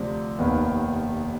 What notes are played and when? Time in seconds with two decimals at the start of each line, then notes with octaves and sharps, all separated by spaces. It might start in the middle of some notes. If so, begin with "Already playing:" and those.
Already playing: D2 C3 F3 D5
0.38 F1 D#2 D#3 B3